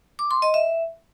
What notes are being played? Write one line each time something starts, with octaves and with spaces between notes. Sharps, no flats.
D6
C6
D#5
E5